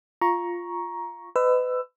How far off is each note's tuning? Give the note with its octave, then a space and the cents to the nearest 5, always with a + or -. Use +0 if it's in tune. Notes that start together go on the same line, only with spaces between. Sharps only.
F4 +0 A#5 +15 C#6 +0
B4 +30 D#5 -15 E6 +15